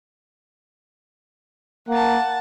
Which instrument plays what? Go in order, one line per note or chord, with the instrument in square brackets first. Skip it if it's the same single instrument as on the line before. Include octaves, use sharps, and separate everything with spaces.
[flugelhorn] A#3 [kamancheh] F#5 A5